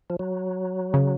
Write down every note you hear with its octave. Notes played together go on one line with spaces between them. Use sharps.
F3
F#3
C#3